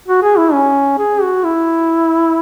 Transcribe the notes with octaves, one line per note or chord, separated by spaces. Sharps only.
F#4
G#4
E4
C#4
G#4
F#4
E4